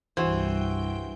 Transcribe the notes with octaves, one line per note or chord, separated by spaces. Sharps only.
C2 G2 E3 F#4 C5 G5 G6